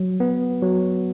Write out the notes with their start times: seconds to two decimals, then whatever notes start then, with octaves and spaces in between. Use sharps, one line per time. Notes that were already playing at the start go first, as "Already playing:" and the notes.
Already playing: F#3
0.20 B3
0.62 F#3